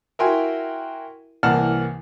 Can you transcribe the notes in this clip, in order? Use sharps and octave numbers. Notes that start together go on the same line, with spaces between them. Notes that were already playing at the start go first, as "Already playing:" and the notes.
E4 F#4 A#4 G5 G#5 C6
C2 E3 A#3 F#5 A5 F6